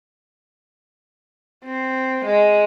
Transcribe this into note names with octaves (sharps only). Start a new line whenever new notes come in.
C4
G#3